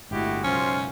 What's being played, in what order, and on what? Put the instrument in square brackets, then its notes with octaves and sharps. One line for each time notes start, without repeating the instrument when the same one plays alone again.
[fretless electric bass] G1 A2 [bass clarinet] G#3 [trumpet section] E4 F#4 G4
[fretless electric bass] B1 F#2 C#3 [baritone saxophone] C#4 [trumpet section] F4 C5